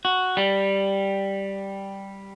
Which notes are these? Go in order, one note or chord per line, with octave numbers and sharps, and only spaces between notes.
F#4
G3